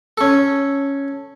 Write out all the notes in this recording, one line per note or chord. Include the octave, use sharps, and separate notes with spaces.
C#4 A4